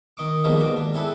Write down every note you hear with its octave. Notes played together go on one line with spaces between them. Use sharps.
D#3 D#5 C#6 D6
B2 D#3 F3 G3 G#3 A#3
G#2 F#4 D6
D4
C4 E4 G#4 A4 B4